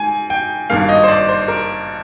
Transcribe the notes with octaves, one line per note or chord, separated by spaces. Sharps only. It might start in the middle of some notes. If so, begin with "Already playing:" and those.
Already playing: G#2 G#5
G5
G#1 G2 D#3 A#3 F5
D#5
C5
D5
C5
A#4